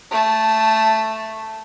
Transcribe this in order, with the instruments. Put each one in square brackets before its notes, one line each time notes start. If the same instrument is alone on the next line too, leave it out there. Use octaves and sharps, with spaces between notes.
[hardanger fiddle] A3 A5